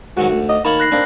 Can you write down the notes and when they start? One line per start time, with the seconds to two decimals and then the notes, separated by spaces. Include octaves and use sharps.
0.17 G#2 D#3 F#3 F#4
0.30 D2
0.49 D#5
0.65 D#3 A#3 C#5 A5 B5 F#7
0.80 F#6 A#6 C7
0.92 A#3 C4 D4